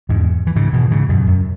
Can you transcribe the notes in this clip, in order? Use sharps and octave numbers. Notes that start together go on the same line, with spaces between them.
E2 G#2
E3
G#2 C#3
B2 E3
G#2 C#3
F#2 B2
F#2